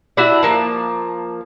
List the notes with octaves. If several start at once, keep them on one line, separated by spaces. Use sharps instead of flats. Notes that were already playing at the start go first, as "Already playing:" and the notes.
D4 E4 F#4 E5
F3 A#3 A5